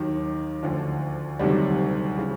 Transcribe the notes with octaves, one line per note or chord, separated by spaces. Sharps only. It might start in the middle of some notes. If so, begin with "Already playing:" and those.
Already playing: D#2 D#3 F#3
D2 D3 F3
D2 C3 D#3 F#3 G3
C#3 E3